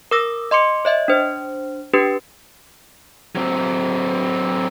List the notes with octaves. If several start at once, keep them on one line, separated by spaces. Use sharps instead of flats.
A#4 D6 E6 A#6
D#5 C6 D6 C#7
C#5 D#5 E5
D4 C5
D4 G4 B4
F#3 C4